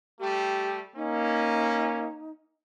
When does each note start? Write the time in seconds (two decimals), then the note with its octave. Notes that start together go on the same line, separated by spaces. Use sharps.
0.20 G3 A3 G4
0.96 A#3 C#4 D#4